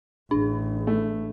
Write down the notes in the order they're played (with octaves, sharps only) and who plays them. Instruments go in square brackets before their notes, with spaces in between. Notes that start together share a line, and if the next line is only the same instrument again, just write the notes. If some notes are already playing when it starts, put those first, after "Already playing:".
[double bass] A1 [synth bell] D4
[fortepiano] A3